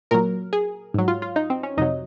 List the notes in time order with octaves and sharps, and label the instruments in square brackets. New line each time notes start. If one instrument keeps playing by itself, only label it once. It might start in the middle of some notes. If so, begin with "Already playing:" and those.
[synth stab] A#2 F#3 A#4
G#4
G#2 F#3
F4
F4
D#4
C4
C#4
F2 C3 F#3 D#4